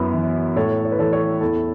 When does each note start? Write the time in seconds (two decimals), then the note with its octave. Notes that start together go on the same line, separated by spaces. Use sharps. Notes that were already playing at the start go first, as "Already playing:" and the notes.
Already playing: F#2 B3 E4
0.14 E3
0.56 A2 A4 C#5
0.85 C#5
0.92 B4
0.99 E3 A4 C#5
1.13 A4 C#5
1.41 E2 E4 A4